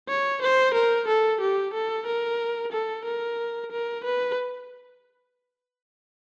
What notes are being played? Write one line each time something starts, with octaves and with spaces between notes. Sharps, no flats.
C#5
C5
A#4
A4
G4
A4
A#4
A4
A#4
A#4
B4